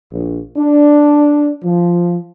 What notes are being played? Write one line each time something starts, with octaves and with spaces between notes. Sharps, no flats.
A#1
D4
F3